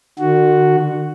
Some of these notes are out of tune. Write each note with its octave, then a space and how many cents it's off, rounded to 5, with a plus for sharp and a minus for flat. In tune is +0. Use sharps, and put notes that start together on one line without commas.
D3 +45 F#4 +0